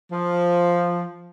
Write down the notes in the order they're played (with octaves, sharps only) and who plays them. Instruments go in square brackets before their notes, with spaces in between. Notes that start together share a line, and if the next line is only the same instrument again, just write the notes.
[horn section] F3